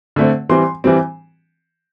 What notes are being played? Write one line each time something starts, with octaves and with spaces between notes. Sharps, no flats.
D3 A3 C4
E3 G3 C4 C6
E3 G3 C4